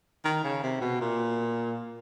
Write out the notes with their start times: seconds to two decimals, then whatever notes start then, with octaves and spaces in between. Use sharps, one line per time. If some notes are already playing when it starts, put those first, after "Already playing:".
0.25 D#3
0.44 C#3
0.63 C3
0.81 B2
1.01 A#2